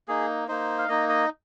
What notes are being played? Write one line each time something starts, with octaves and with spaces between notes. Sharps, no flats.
A#3 D#4 G#4
A#3 D#4 C5
F5
A#3 D#4 D#5
D#5